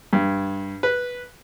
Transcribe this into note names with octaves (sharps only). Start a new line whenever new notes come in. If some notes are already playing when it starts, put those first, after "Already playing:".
G2
B4